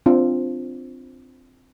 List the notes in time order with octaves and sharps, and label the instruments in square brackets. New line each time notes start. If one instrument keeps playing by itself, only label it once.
[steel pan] C4 D4 F4